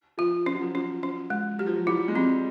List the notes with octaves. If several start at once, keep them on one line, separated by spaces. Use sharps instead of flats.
F3 F4
F3 C#4
F#3
F3
F3 C#4
C#4
G#3
F#3 G4
F3
F#3
G3 E4
G#3
G3 C4